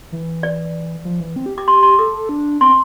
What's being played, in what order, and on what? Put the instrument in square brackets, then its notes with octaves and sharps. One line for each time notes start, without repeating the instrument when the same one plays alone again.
[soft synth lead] E3
[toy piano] D5
[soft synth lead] F3
E3
C4
G4
[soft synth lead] G4 [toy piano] D6
[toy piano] C6
C6
[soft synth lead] A4 [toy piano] D6
[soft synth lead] D4
[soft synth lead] C4 [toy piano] C6